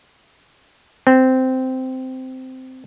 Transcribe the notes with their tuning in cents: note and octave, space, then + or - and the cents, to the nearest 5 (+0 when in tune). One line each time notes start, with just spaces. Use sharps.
C4 -10